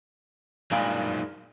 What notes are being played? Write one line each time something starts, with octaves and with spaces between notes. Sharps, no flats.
G2 A#2 F#3 G#3 D#4 D5